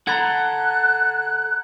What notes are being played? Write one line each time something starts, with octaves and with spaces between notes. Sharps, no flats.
A4 F#5 A#5 B5 F#6 G#6